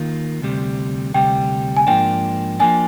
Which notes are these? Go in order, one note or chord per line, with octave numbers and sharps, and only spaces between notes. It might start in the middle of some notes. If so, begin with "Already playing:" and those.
Already playing: D#3 A#3 F4
D2 C3 G3
D2 C3 G3 G5
G#5
G#2 F3 A#3 D4 G5
F3 A#3 D4 G#5